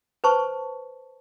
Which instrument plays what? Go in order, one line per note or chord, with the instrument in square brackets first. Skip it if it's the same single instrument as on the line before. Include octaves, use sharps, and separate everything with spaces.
[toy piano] B4 C5 A5 C#6